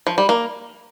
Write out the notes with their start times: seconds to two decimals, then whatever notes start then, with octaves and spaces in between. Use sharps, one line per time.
0.07 F3
0.18 G3
0.29 A#3